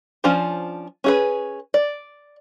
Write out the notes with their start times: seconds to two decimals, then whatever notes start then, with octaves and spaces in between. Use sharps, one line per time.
0.24 F3 C#4 D4 F4 C5
1.04 C#4 G#4 B4
1.74 D5